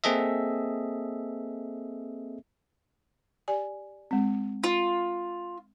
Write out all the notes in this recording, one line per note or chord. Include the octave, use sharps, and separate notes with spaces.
A#3 C4 G#4 A4 D#5 E5
G4 D5 G#5
G#3 C4
F4